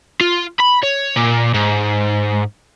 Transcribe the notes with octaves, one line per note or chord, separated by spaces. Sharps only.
F4
B5
C#5
A#2
G#2